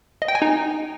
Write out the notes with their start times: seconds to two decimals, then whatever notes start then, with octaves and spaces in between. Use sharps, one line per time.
0.22 D#5
0.28 G5
0.35 G#5
0.42 D#4